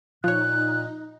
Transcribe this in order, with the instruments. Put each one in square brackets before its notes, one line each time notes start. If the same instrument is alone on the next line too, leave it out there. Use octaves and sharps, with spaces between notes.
[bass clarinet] A#2 [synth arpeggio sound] F3 C#5 [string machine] D#4 [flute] F#6